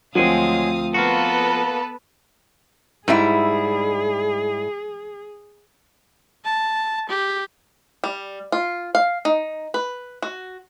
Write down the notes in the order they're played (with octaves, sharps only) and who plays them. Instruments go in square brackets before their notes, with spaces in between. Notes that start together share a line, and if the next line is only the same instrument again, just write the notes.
[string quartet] D2 F5 D#6 [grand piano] F3 C4 [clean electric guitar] F#3 G#3 G#4
[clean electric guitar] A#3 F4 F#4 [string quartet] B3 A4 B4
[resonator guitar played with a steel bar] G#2 G3 E4 [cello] G#4
[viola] A5
G4
[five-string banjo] G3
F4
F5
D#4
B4
F#4